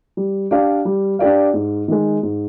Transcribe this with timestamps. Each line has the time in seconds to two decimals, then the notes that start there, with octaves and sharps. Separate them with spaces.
0.17 G3
0.51 D4 G4 D5 F5
0.85 G3
1.19 D4 G4 D5 F5
1.54 G#2
1.88 D#3 G#3
2.23 G#2